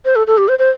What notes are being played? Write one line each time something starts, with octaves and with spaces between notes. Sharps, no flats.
C5
A4
A4
G4
C5
C5